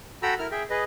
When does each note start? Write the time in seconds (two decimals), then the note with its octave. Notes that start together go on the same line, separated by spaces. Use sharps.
0.23 F#4 A4 G5 A#5 B5 E6
0.39 E4 A#4 F6
0.51 G#4 E5 G5
0.70 G#4 B4 D#5